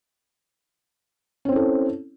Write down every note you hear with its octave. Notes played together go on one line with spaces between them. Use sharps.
C4 C#4 E4 A4